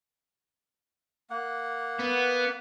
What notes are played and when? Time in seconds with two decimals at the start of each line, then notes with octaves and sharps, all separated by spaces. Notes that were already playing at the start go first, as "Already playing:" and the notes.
1.30 A#3 F#5
1.99 B3